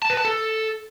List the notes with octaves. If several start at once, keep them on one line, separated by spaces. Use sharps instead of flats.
A5
B4
A5
A4